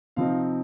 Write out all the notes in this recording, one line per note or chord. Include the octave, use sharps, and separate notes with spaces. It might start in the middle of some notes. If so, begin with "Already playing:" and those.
C3 F3 C4 D#4 F5